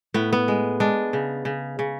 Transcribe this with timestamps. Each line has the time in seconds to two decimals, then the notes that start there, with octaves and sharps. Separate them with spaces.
0.14 A2 B3
0.33 B3
0.48 G#3
0.80 G#3 D4
1.13 C#3
1.45 C#3
1.79 C#3